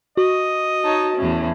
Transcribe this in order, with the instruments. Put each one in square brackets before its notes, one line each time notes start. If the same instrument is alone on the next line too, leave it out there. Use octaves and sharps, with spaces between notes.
[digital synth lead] F#4 [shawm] D#5
[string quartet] D#4 C#5 A5
E2 A2 C#4